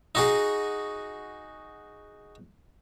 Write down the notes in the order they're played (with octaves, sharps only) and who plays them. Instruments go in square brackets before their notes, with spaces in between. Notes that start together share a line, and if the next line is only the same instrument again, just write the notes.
[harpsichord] D#4 F#4 G#4